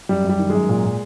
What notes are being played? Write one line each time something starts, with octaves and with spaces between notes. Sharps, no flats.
F#2 G3
F#2 G3
D#3
F#2 G#3
A#2
A#2